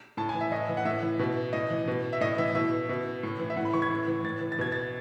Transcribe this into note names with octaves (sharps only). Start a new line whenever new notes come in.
A2 A5
G#5
E3
E5
A2 D#5
E3
F#5
A2 E5
E3
B2
A2 D#5
E3
B2
E5
A2 D#5
E3 E5
B2 E5
B2
A2
E3
E5
A2 F#5
B5
E3 C#6
G#6
A2
E3
A2 A6
E3
A6
B2 G#6
A6